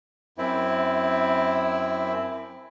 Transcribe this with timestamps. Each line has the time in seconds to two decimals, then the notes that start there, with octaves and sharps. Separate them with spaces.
0.38 F#2 C4 E4